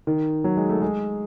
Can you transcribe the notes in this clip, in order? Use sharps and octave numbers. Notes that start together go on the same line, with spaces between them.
D#3
F#3
G#3
A3
G#3